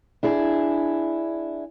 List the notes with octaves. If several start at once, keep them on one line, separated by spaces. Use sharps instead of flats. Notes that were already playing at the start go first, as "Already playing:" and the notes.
D4 E4 G#4